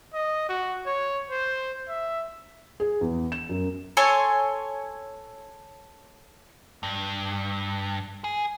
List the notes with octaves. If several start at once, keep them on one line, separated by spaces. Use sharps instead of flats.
D#5
F#4
C#5
C5
E5
G#4
E2
E7
F#2
A4 C#5 G#5 C6
G2
G#4